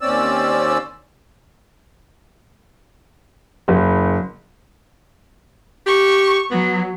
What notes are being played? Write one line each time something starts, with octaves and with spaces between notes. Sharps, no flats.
D#2 C4 C#4 D5 E6
F#1
G4 C#6
F#3 B3